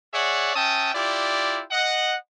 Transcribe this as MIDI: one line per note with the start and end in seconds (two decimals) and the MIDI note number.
0.14 0.53 68
0.14 0.53 73
0.14 0.53 74
0.14 0.53 76
0.14 0.53 78
0.56 0.93 61
0.56 0.93 76
0.56 0.93 79
0.56 0.93 81
0.56 0.93 87
0.95 1.63 64
0.95 1.63 65
0.95 1.63 67
0.95 1.63 74
1.71 2.15 75
1.71 2.15 78